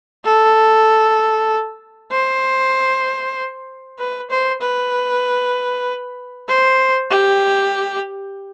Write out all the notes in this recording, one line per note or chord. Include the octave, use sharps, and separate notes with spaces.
A4
C5
B4
C5
B4
C5
G4